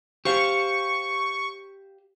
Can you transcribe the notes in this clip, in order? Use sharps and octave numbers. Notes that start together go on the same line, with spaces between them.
G4 C5 F5 C#6